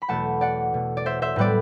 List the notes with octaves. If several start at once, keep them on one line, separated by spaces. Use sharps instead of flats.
B5
E2 B2 A3 F#5 A5
D5 F#5
B2 A3
D5
C5 E5
C5 E5
A2 G3 B3 B4 D5